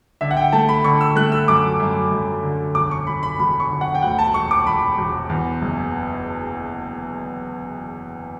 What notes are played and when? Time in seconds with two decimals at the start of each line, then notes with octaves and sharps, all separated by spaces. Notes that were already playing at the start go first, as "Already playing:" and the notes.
0.21 D3 E5
0.31 F#5
0.37 G5
0.52 A3 A5
0.69 B5
0.84 D3 C#6
1.01 E6
1.16 A3 F#6
1.32 E6
1.48 F#2 D6
1.80 F#2
2.11 F#2
2.43 D3
2.75 E1 D6
2.91 C#6
3.07 E1 B5
3.23 B5
3.39 E1 B5
3.60 C#6
3.71 D3
3.81 F#5
3.95 G5
4.02 D2 F#5
4.19 A5
4.34 E1 C#6
4.51 D6
4.66 E1 B5
4.98 E1
5.29 E2
5.62 F#1